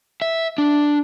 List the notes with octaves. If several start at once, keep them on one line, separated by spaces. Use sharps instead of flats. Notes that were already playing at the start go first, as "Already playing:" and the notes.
E5
D4